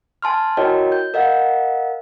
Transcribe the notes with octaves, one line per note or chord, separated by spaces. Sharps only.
G#5 A5 C6 F6
E4 F#4 A#4 C#5 D#5 G5
G6
A#4 D#5 F5 F#5